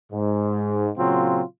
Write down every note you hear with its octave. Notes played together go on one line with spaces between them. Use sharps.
G#2
A#2 C#3 F#3 C4 F4